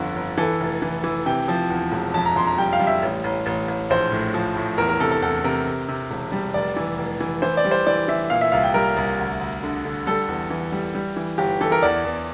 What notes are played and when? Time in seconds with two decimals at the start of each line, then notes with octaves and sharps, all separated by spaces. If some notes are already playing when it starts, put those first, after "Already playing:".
Already playing: G1 F2 D3
0.16 G1
0.37 E3 A4
0.60 F1
0.82 E3
1.04 E3
1.26 C3 G5
1.48 F3
1.70 E2
1.92 E1
2.14 F2 A5
2.25 A#5
2.36 F2 C6
2.47 A#5
2.58 G3 G5
2.73 F5
2.80 G3
2.87 E5
3.02 A1
3.24 A1
3.46 A1
3.68 A1
3.90 A#1 C5
4.12 A2
4.34 F3
4.56 A2
4.78 E2 A#4
4.89 A#4
5.00 C3 A4
5.11 A4
5.22 E2 A4
5.44 C3 A#4
5.66 C3
5.88 C3
6.11 E1
6.32 G3
6.54 F1 D5
6.76 E3
6.98 F1
7.20 E3
7.42 E3 C5
7.57 D5
7.65 G3
7.71 C5
7.86 E3 D5
8.08 E3 E5
8.30 A#2 F5
8.41 E5
8.52 C2 F5
8.63 G5
8.74 G3 A#4
8.97 C2
9.19 D2
9.40 D2
9.63 D3
9.85 D3
10.07 G3 A4
10.28 E2
10.50 E3
10.72 G3
10.95 G3
11.16 E3
11.38 G1 G4
11.61 E3 A4
11.72 A#4
11.82 E2 D5
12.04 E2